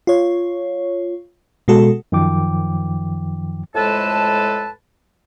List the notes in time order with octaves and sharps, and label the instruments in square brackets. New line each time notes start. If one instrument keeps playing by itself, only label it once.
[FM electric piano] F4 C#5
B2 G#3 F#4 A4
[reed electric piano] F#2 D#3 F3 G5 D6
[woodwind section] F2 A2 G#3 A4 B4 A5